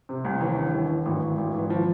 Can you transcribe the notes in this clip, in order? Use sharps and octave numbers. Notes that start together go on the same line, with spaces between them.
C3
C2
D#2 E3
D3
D#2
D3
G#1 E3
G#1
G#1
G#1 E3
F3